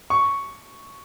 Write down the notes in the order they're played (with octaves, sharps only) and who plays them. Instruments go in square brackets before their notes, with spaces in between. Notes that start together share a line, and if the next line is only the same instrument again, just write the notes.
[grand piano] C#6